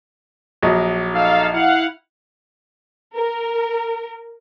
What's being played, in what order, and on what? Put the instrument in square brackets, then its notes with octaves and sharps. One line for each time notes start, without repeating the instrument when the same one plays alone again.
[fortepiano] A#1 F#3 D#5
[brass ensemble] D#4 A4 F5
E4 F5 F#5
[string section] A#4